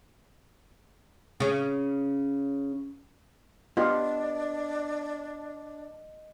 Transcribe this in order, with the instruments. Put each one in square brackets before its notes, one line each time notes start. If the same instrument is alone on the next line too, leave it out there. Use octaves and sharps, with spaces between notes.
[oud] C#3 C#4
[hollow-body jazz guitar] B3 [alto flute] D4 [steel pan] F4 G4 [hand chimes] D#5